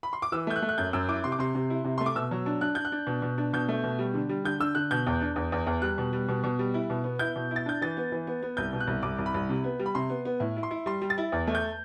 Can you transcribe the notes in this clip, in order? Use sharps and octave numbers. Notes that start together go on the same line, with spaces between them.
B5
C6
D6
E3 E6
A3 G6
F#6
A3
F#6
F#2 G6
F#2 E6
E4 D6
C3 C6
D6
C3 C6
C3
E4
C3
A3 C6
D6
B2 E6
F#3
D4
D4 F#6
D4 G6
F#6
D4
B2
B2
D4
B2 G6
A3
B2
G3
D3
G3
D3 G6
D3 E6
D3 F#6
B2 G6
E2
D4
E2
E2
E2
G3 F#6
B2
G3
B2
B2
G3
E4
B2
B3
E4 G6
B2
E4
A6
D4 G6
E3 A6
B3
E3
B3
B3
C2 G6
B2
F#6
C2
C2 D6
C2
B5
C2
C3
B3
G3
B5
C3 C6
B3
B3
A2
E4
C6
E4
G3 C6
G3
A6
E4
E2
A3
G6